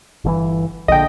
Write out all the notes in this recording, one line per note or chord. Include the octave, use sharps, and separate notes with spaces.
G1 D3 E3
A#1 D3 D#5 G5